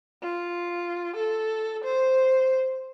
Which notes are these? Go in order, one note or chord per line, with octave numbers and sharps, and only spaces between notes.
F4
A4
C5